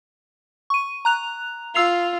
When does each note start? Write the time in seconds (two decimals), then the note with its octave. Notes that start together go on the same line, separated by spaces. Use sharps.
0.70 C#6 D#7
1.05 A#5 F#6 F7
1.75 F4 E6 C7 F7